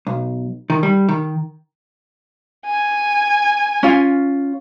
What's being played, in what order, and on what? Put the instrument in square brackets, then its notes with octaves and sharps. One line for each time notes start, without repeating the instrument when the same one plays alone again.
[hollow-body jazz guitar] B1
D#3
G3
D#3
[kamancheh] G#5
[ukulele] C#4 F4